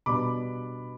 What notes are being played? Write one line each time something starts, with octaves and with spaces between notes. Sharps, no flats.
B2 G3 B3 D4 B5 D6